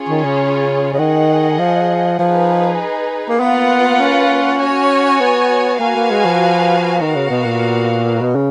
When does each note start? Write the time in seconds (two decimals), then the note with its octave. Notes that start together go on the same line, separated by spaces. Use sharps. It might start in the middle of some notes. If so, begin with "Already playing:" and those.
Already playing: C#4 F4 G#4 C#5
0.09 D#3
0.24 C#3
0.93 C#3
0.99 D#3 G#4 D#5 F#5
1.59 F3
2.19 F3 D#4 G#4 B4
3.29 A#3
3.40 A#3 B3 F4 B4 F#5
4.00 C#4
4.60 F#4 C#5 G#5
5.20 B3
5.80 A#3 F#4 B4 F5 G#5
5.96 A#3
6.11 G#3
6.25 F3
7.01 D#3 B3 F#4 A#4 F5
7.15 C#3
7.30 B2
7.45 A#2
8.21 B2
8.35 C#3